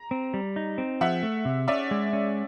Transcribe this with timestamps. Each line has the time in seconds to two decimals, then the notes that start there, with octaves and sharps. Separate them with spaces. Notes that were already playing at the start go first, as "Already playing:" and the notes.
Already playing: A#5
0.11 C4
0.34 G3
0.56 D#4
0.78 C4
1.01 F3 E5 F#5
1.23 A3
1.45 C3
1.68 C#4 D5 E5
1.91 G#3
2.13 C#4